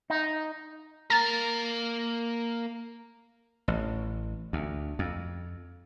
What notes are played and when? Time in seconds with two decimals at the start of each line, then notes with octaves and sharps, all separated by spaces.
0.10 D#4
1.10 A#3 A#4 A#5 A6
3.68 A1
4.53 D2
4.99 F2